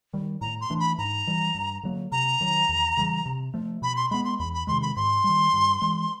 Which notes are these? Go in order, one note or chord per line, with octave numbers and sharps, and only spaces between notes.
D#3 G3
A2 A#5
C6
E3 A3 D4
B5
G#2 A#5
E3 G3
G2
D3 F#3 A#3
C3 A#5
D#3 F#3
E2
C#3 E3 G3
C3
F3 A3
B2 B5
C6
G#3 B3 B5
C6
E2 B5
B5
C3 D#3 G#3 C6
B5
G#2 C6
G3
D#3
G2
E3 G#3